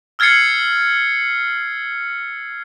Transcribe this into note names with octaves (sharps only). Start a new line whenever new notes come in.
E6 F6 G#6 A6 C7 C#7